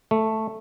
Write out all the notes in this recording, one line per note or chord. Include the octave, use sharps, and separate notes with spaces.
A3